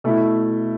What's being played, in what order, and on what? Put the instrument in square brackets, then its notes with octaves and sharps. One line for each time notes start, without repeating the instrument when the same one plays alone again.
[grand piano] B2 A3 E4